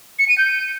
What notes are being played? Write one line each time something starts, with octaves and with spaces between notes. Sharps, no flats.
C#7
D#7
G6